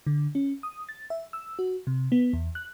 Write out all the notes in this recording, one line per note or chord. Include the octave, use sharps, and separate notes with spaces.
D3
C#4
D#6
A6
E5
E6
F#4
C3
B3
E2
F#6